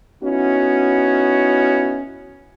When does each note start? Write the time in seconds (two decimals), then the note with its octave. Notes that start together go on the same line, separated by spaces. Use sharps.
0.23 B3 C#4 D#4 E4 F#4